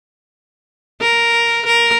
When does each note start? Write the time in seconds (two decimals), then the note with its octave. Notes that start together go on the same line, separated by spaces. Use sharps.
1.01 A#4
1.66 A#4